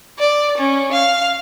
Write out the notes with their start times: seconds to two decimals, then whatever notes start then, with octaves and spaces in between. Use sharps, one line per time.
0.19 D5
0.57 C#4
0.92 F5